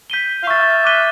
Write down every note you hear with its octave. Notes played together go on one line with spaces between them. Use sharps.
G6 B6 D#7 G7
F5
E5 C#6 F6 A6
D6 F#6 B6 D#7 G7